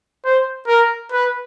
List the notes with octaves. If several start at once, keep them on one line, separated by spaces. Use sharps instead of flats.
C5
A#4
B4